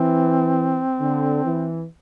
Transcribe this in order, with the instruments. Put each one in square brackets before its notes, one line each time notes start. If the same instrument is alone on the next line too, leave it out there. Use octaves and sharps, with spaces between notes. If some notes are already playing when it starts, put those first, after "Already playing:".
Already playing: [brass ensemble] E3 [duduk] C4
[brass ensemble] D3
E3